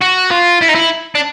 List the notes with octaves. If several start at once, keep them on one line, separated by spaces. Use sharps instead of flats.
F#4
F4
E4
D#4
E4
D4